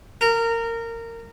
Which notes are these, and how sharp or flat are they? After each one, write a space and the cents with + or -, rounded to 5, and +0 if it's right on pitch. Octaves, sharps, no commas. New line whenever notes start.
A#4 -20